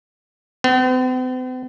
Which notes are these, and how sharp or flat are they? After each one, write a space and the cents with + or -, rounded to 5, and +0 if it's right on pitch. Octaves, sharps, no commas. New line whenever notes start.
C4 -45